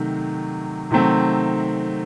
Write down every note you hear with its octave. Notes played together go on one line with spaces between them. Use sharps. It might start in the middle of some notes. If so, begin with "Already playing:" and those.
Already playing: C3 D#3 F#3 A3
C3 D#3 F#3 A3 C4